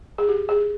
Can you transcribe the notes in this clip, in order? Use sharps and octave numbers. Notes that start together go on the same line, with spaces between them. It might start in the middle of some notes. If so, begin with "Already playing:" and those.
G#4
G4
G#4